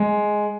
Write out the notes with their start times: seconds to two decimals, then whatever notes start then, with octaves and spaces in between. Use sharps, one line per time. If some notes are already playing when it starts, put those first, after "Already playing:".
Already playing: G#3